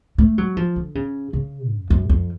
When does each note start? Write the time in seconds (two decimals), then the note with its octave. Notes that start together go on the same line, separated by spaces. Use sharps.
0.18 A3
0.38 F#3
0.57 F3
0.76 D3
0.95 C#3
1.33 C#3
1.71 F#2
1.90 F#2
2.09 F2